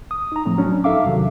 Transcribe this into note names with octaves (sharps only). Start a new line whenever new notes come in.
D#6
D#4 A#5
A2 F3 A3 C4
F#3 C#4 D4
G#2 D#4 A4 E5 F5 D6
E2 C3 D#3 F#3